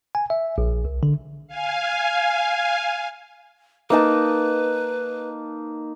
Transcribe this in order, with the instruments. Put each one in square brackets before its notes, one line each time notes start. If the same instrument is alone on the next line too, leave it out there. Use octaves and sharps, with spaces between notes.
[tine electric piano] G#5
E5
A#1
C2
D3
[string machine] F5 G#5
[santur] A#3 D#4 A5 [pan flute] B4